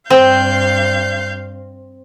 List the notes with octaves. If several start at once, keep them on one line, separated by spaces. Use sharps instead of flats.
G2 C4 F5 G6